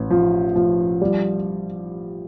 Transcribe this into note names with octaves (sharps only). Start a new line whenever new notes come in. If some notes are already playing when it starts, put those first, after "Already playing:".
Already playing: A1
F3
F3
G3